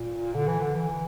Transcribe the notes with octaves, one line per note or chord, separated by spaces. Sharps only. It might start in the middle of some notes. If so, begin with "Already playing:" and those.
Already playing: A#2
D3
E3
D3
E3